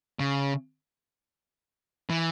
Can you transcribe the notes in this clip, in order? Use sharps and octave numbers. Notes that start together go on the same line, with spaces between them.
C#3
E3